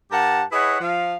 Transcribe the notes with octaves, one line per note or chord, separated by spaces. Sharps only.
G2 G4 A#4 F#5 A5
E4 G#4 B4 C#5 D#5 F#5
F3 F5